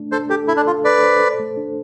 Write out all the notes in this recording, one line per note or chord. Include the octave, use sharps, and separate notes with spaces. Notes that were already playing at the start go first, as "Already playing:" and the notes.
Already playing: A3 D4
D4 A4 C5
G4 A4
E4 A4
D4
F4 A4
A4 B4 D5
C5
A4
A3
D4